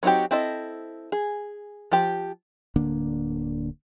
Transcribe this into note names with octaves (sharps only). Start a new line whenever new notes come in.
F#3 C4 D#4 F#4 G4
C4 E4 A4 D#5
G#4
F3 G4
D1 D3 A#3 D4